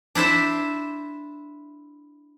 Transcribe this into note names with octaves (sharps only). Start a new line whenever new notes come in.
D4 E4 C5 E5